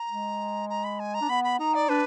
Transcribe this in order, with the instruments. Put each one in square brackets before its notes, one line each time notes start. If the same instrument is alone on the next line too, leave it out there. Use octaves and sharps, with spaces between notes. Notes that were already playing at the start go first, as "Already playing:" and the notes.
Already playing: [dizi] A#5
[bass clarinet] G#3
[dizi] A#5
B5
G#5
A#5
[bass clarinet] D4
[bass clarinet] B3 [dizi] B5
[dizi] B5
[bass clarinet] D#4 [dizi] A#5
[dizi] D5
[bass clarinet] D4 [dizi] B4